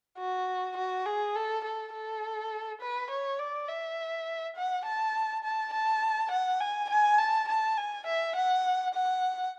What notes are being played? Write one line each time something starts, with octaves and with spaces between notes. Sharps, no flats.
F#4
F#4
G#4
A4
A4
A4
B4
C#5
D5
E5
F#5
A5
A5
A5
F#5
G#5
G#5
A5
A5
G#5
E5
F#5
F#5